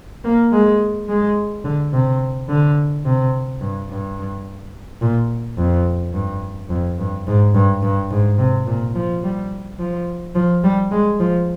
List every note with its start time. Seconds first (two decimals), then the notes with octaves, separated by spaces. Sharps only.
0.24 A#3
0.52 G#3
1.09 G#3
1.64 D3
1.93 C3
2.49 D3
3.05 C3
3.61 G2
3.90 G2
5.01 A#2
5.58 F2
6.14 G2
6.70 F2
6.98 G2
7.27 G#2
7.55 G2
7.82 G2
8.11 G#2
8.38 C3
8.67 A#2
8.95 F3
9.23 G3
9.79 F3
10.35 F3
10.64 G3
10.92 G#3
11.20 F3